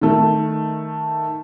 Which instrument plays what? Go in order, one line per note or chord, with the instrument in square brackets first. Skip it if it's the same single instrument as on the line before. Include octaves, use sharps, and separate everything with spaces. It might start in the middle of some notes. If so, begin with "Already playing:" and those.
[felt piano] D#3 A3